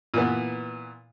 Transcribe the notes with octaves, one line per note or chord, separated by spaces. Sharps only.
A#2 E3 B3